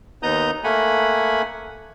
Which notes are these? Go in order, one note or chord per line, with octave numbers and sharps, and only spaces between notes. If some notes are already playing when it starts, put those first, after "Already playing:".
D#2 B3 D#4 A#5 D#6 G6
A3 A#3 F#5 G#5 B5